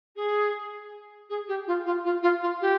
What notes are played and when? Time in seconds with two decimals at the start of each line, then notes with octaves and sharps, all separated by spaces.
0.15 G#4
1.29 G#4
1.48 G4
1.67 F4
1.85 F4
2.04 F4
2.22 F4
2.42 F4
2.61 G4